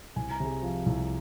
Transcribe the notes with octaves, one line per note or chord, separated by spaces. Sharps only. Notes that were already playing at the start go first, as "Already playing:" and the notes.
C2 G#5
A#5
C3 G#4 G#5
F3
C2